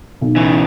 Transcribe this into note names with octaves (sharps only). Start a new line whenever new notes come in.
B1
C#3 E3